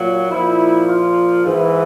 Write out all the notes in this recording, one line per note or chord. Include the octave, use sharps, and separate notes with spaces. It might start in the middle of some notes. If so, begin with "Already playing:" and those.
Already playing: A#2 F#3
A#2 F3 E4
F4
G#2 E3